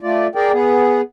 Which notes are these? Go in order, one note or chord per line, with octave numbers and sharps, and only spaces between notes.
A3 F4 D5
G#4 A#4 D5 G5
B3 G#4